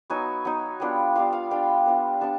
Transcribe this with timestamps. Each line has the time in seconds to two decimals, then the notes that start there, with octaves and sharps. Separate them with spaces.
0.10 F#3 B3 D#4 G#5
0.45 F#3 B3 D#4
0.80 G3 B3 D4 F4
1.16 G3 B3 D4 F4 F5
1.33 F5
1.51 G3 B3 D4 F4 G5
1.86 G3 B3 D4 F4
2.21 G3 B3 D4 A5